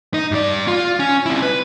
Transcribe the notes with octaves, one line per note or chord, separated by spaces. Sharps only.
D#4
G2 D5
F4
C#4
C4 E4
B4